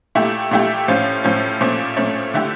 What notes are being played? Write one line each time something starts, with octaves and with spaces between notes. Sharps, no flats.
A#2 A3 E4 G4
A#2 A3 E4 G4
A2 F3 C#4 F4
A2 F3 C#4 F4
A#2 F3 A3 C#4
A#2 F3 A3 C#4
D3 A3 E4 G4